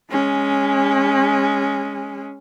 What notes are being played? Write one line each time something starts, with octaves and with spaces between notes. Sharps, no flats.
G#3 C#4